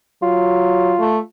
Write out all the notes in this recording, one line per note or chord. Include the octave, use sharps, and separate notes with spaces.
F#3 F4
A3